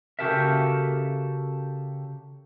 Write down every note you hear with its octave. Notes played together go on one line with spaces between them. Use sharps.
C#3 F#4 G4 A4 A#4 E5